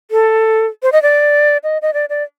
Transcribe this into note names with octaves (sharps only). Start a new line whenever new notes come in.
A4
C5
D#5
D5
D#5
D#5
D5
D5